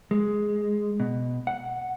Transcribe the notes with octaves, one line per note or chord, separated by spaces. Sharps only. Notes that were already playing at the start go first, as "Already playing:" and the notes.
G#3
B2
F#5